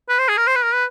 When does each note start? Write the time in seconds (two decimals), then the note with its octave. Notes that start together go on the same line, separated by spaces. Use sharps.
0.09 B4
0.19 C5
0.28 G#4
0.37 A#4
0.47 C5
0.55 B4
0.64 A#4
0.73 B4